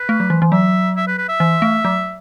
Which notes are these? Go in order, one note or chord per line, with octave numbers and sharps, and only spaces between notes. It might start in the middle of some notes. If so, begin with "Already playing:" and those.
Already playing: B4
A3
F#3
E3
E3
F#3 E5
E5
B4
B4
E5
E3
A3
F#3